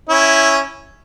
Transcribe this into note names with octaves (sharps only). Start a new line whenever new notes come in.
C#4 E4